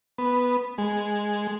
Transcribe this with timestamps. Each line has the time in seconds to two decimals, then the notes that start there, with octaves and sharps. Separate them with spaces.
0.18 B3
0.78 G#3